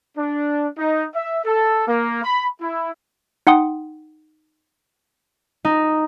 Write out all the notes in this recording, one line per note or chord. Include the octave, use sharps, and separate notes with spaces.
D4
D#4
E5
A4
A#3
B5
E4
D#4 F#5 G5 C6 D#6
D#4